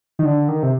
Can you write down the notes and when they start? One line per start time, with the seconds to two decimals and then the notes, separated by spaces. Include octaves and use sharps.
0.19 D#3
0.25 D3
0.48 D#3
0.63 C3